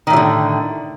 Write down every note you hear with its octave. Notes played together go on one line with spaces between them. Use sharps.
A2 D3 D#3 F#3